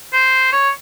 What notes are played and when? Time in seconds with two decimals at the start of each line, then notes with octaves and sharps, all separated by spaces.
0.13 C5
0.52 C#5